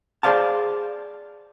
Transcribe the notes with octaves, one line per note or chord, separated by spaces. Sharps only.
G#4 C5 D5 F5 A5